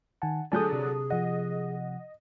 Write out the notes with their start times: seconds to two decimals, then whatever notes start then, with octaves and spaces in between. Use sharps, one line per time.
0.22 D#3 F#5 G#5 A5
0.52 D3 F#3 D4 G#4 G#5 A5 D#6 G6
0.72 C3
1.10 F3 D#5 F#5